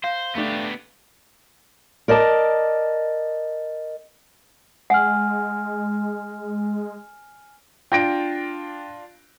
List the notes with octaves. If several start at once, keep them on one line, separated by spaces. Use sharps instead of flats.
C5 F5
A3 B3 D4 G4
A#4 D5 D#5 A5
G#3 F#5 G#5 F6
D4 F4 G5 A#6 D7